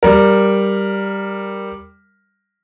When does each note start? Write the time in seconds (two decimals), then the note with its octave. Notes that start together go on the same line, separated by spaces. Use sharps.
0.03 G3 A#4